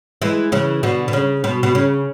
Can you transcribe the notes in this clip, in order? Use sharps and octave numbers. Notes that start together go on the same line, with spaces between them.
E3 G#3
C#3 E3
B2 D3
B2
C#3
B2
B2
C#3